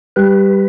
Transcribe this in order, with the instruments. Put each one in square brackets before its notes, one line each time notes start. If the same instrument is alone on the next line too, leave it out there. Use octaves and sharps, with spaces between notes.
[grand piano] G3 [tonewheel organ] B4